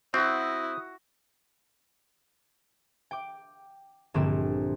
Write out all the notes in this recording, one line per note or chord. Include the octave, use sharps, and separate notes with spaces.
C4 E4 F#4 D#6
G5 D6
A#1 G2 D3 C4 E7